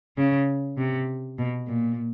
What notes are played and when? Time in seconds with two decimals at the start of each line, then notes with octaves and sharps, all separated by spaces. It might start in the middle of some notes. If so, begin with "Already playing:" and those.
0.17 C#3
0.78 C3
1.38 B2
1.68 A#2